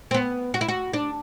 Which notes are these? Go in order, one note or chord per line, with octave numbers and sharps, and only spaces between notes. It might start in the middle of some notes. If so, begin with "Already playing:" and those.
C4
B3
F#4
E4
F#4
D4